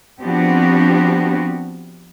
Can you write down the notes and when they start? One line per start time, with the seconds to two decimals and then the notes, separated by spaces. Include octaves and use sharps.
0.22 F3 B3 C4 D4 F#4 G4